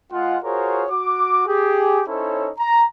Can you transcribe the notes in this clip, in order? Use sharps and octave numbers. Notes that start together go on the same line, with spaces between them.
G#3 F4 F#5
F4 F#4 G#4 A#4 C5 C#5
F#4 D6
G4 G#4
C#4 D#4 E4 A4 C5 C#5
A#5